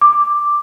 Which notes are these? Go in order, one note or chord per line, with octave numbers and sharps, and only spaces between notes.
D6